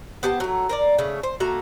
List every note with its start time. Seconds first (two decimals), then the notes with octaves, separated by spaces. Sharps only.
0.23 B3 G4 C5 A5
0.40 F#3 A3
0.69 A#4 C5 D5
0.99 C#3 A3
1.23 C5
1.40 A3 A#3 F#4 A#5